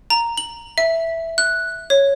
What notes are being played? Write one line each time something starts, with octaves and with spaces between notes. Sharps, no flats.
A#5
F#7
E5
F#6
C#5